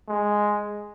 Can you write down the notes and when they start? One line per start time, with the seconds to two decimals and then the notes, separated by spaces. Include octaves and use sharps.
0.08 G#3